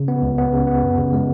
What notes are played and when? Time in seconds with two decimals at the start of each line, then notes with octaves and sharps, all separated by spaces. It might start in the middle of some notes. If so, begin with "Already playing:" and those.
Already playing: C#3
0.08 B3
0.23 C#2
0.38 B3
0.53 C#3
0.67 B3
0.83 F#2
0.98 C#3
1.13 G#3